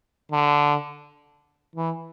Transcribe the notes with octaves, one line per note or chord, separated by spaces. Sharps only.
D3
E3